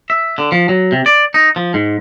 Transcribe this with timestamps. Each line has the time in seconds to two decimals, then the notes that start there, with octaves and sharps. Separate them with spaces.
0.10 E5
0.38 D3
0.52 F3
0.69 F#3
0.92 C3
1.06 D5
1.34 D#4
1.56 F3
1.74 G#2